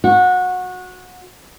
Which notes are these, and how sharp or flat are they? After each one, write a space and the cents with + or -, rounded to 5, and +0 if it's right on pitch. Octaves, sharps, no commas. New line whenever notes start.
F#4 -20